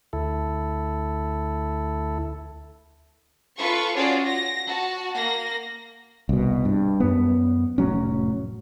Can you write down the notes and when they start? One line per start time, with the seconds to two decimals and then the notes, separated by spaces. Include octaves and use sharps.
0.13 D2 E4 A4
3.57 F4 A4 B4 C#6
3.96 C#4 F4 F#4 G#4 C#5 D5
4.25 A#6
4.67 F#4 A5
5.14 A#3 A#6
6.29 C2 B2
6.65 G2
7.00 F#2 B3
7.78 F1 A2 F#3 C#4